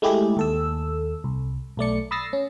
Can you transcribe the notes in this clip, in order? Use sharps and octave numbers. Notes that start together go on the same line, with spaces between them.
G#3 A3 E4 G4 G#4
D#2 A4 E6
C2
B1 A3 D5 C#7
B5 D#6 E6 A6 A#6 C7
C#4